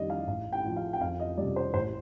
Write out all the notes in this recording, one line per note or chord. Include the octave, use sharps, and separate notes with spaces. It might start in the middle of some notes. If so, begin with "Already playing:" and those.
Already playing: F2 D#3 G3 D5 D#5
F5
A1 F5
G5
A2 F3
F5
G5
F2 F5
D#5
C3 G3 D5
C5
A1 C5